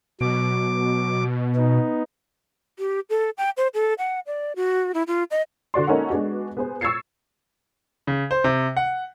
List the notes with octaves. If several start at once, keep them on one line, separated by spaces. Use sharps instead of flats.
B2 F#3 D6
B3 D#4
G4
A4
G5
C5
A4
F#5
D5
F#4
E4
F4
D#5
D3 F#4 D5 C6
A#3 C#4 D#4 A4 A#4 F#5
G#3 B3 D4 F#4
B3 G#4 C5
C#6 E6 G#6 A6 C7 C#7
C#3
C5
C3
F#5